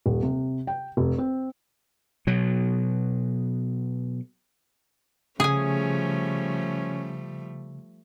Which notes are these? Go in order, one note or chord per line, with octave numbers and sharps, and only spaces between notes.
D#1
C3
G5
F1
C4
B2 F#3
C#3 F3 G3 A3 C#4 G#4 G#5